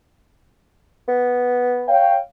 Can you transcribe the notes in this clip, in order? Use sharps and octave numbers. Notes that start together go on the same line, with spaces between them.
B3
C#5 F5 G5